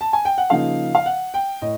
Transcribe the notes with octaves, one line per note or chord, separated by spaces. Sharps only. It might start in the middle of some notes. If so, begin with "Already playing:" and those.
A5
G#5
G5
F#5
C#3 F3 A#3 D#4 F5
F5
F#5
G5
A2 D#5